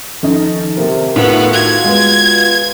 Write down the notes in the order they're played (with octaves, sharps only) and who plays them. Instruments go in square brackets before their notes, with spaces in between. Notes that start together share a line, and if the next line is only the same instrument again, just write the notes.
[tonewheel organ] D#3 F3 A4 [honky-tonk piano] C#4 D#4
[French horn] C3 [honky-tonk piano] A#3
[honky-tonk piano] A2 D#3 [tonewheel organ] A3 [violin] B3 [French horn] F4
[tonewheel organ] F#4 [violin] G#6
[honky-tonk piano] G#3 B3